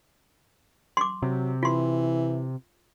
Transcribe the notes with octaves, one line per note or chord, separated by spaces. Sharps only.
C6 D6
C3 F#3
E3 F4 C6